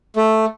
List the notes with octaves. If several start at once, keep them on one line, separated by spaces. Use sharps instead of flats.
A3